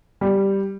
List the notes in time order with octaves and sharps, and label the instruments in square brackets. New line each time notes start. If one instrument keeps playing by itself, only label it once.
[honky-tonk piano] G3